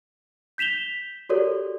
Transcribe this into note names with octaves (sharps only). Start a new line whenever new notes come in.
G6 B6 E7 F7 G7
F#4 G4 A4 A#4 C#5 D5